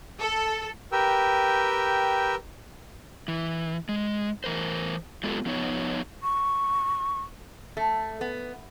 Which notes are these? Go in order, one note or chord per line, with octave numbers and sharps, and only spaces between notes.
A4
G4 A#4 B4 G5 E6
E3
G#3
E3 A#4 C5
F#3 G#3 B3 F4 G4 A4
F3 B3 D#4 C#5
C#6
A3
B3